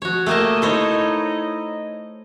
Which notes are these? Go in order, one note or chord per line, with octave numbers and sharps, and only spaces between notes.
F3 F#4 C#5
A3 A#3 D#5 G5 D#6 E6
D#4 E4 A4 C5 C#5 D#5